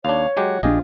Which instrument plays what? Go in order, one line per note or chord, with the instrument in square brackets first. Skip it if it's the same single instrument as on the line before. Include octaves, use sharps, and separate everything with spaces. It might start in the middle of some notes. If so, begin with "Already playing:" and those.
[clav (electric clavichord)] D#2 D4 [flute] C#5 [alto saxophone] F5
[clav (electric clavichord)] F#3 G#3 G4 [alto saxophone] F#4
[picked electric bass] A#1 C4 D4 [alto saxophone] F4 [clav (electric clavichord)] G4 G#4 D#5